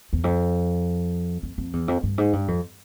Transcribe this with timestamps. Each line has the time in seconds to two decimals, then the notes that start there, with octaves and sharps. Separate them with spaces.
0.13 E2
0.24 F2
1.43 F2
1.58 F2
1.73 E2
1.88 F2
2.03 G2
2.18 G#2
2.33 G2
2.48 F2